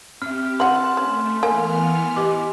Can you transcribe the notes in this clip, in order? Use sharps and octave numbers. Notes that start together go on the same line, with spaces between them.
C4 G4 E5 F6
E3 F#5 A5 C6 F#6
A3 C#4
E3 A#3 B3 G#5 F6
E4 G4 D#5 D6